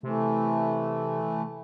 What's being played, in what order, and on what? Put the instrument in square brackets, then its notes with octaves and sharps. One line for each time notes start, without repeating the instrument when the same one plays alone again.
[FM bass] C3 [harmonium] E3 A3